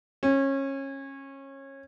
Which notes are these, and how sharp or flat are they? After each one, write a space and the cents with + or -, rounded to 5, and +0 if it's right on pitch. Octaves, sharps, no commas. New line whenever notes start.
C#4 -25